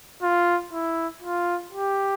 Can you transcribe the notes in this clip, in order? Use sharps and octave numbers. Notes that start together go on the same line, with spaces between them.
F4
E4
F4
G4